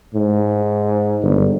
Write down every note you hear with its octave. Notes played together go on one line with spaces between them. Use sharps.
G#2
G1